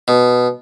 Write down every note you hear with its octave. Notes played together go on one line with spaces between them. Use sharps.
B2